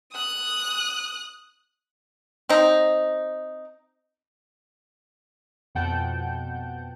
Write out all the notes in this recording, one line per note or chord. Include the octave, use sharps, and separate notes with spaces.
D#6 F#6
C4 D#4
F2 B2 F#5 G5 A5 G6